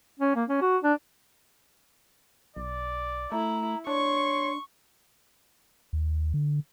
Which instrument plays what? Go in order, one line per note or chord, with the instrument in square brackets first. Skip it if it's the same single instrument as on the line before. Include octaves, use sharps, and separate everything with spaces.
[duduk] C#4
A#3
C#4
F#4
D4
[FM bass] B1 [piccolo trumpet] D5
[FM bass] A3 [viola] E4 [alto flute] A#5
[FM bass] D4 [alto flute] C#5 [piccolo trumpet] C6 [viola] C#6
[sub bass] D#2
D3